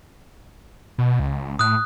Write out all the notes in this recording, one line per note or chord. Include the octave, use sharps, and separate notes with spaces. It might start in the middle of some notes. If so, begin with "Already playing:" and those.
B2
C#2
A2 D#6 F#6